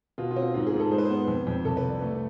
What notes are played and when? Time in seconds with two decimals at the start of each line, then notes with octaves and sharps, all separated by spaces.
0.18 B2 F4
0.31 F4
0.36 C4
0.42 F4
0.54 G#2 F4
0.67 G#4
0.73 G#2
0.80 A4
0.91 G#3 C5
0.98 B4
1.05 B3 C5
1.27 F2
1.47 F2
1.64 C2 A4
1.77 B4
1.82 C2
1.89 D5
2.02 A3